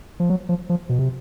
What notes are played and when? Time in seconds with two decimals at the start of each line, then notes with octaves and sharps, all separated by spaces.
0.20 F3
0.30 F#3
0.49 F3
0.69 F3
0.89 B2
0.99 C3